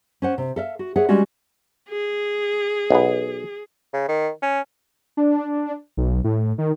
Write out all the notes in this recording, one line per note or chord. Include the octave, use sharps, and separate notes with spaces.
C#4 C5 F#5
C3
A4 E5 F5
F#4
G#4 C#5 E5 F#5
G3 G#3 C#4 F#4
G#4
B1 B3
C#3
D#3
C#4
D4
B1
A2
D#3